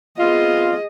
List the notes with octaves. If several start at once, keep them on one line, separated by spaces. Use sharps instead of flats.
B3 C4 F4 G#4 D#5